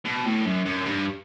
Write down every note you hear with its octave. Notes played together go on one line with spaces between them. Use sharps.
B2
A2
F#2
F#2
G2